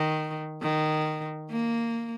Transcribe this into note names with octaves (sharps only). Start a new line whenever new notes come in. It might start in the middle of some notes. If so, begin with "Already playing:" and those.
Already playing: D#3
D#3
A#3